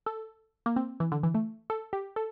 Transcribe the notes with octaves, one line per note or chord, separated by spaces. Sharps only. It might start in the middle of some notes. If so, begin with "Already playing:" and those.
A4
A#3
C4
E3
D3
E3
A3
A4
G4
A4